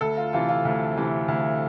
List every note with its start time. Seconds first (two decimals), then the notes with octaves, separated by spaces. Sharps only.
0.01 D2 A4
0.17 F4
0.33 C3 E3 F4
0.49 F4
0.65 D2
0.96 C3 E3
1.28 D2